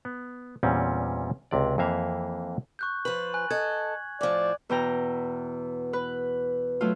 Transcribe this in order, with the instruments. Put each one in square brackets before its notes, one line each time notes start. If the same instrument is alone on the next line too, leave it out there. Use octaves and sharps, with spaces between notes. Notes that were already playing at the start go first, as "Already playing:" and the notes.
[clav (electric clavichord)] B3
E2 A#2 G3 C4 C#4
C#2 C3 D5
F2 E3 A#3 E5 F5
[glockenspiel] C#6 F#6 G6
[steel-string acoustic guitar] F3 B4 [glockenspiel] F#7
[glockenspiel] G#5 F#6
[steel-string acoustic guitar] A4 D#5 [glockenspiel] G#6
[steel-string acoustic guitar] A2 F3 [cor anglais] D5
[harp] E2 B2 G5 A#5
B4
F#3 A3 F4